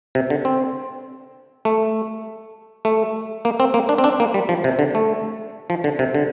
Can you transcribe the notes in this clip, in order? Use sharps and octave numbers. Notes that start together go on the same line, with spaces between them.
C3
D3
C4
A3
A3
A#3
C4
A#3
D4
C4
D4
A#3
G3
F3
C3
D3
A3
F3
D3
C3
D3